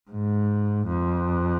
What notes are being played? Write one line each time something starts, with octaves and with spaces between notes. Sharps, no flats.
G#2
F2